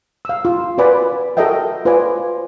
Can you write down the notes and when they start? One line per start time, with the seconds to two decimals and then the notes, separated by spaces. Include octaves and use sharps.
0.25 F5 E6
0.45 F4
0.78 F#4 A#4 B4 D5 G#5 B5
1.37 F#4 A4 A#4 D#5 E5 G5
1.85 F4 B4 C5 D5 G#5 D6